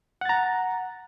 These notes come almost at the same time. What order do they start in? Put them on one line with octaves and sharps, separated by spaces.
F#5 A6 A#5